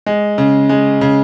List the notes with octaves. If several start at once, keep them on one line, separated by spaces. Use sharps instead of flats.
G#3
C#3
G#3
C#3